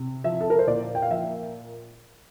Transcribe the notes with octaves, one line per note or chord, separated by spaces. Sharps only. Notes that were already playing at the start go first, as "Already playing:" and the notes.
Already playing: C3
F3 E5
A4
A#4
C5
A#2 D5
G5
F5
F3 E5